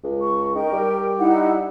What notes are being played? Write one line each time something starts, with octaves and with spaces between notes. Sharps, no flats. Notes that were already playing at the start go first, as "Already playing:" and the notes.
C#2
C#6
D#4 A#4 G5
G3
D#4 E4 F#5